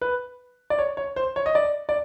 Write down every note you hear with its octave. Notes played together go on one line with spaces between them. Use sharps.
B4
D5
C#5
C#5
C5
C#5
D#5
D5
D5